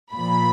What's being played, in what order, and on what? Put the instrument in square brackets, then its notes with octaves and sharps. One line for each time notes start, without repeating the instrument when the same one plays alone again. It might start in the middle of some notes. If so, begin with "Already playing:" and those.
[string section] A#2 F3 B5